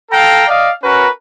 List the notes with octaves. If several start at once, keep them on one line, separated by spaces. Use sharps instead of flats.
A4 F5 G5 A#5
D5 D#5 F5
C#4 F#4 A#4 B4